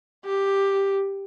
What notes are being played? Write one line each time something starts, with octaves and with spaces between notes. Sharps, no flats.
G4